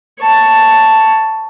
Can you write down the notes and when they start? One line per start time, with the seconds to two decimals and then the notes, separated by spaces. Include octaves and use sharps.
0.20 C#5 A5